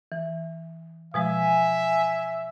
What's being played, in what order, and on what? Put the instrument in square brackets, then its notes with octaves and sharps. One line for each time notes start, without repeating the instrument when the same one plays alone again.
[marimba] E3
[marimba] B2 F3 G#3 [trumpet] E5 [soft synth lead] G#5